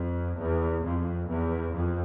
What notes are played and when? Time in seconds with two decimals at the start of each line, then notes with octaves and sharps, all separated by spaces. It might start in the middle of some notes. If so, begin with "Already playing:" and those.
Already playing: F2
0.38 E2
0.84 F2
1.29 E2
1.75 F2